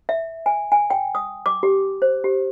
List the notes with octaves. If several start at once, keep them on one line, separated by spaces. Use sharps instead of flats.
E5
G#5
G#5
G5
D#6
D6
G4
C5
G4